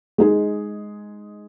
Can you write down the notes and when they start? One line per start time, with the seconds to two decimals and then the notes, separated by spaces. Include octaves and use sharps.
0.18 G#3 D#4 G#4